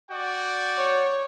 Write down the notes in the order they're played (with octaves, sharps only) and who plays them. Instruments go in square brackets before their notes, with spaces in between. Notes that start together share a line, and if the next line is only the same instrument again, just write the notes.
[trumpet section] F#4 D5 G5
[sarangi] C#5